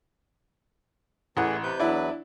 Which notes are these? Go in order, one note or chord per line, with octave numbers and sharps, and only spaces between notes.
A1 E3 A3 G#4 F#5 F#6
C3 B4 G6
E2 F#3 D4 E4 B4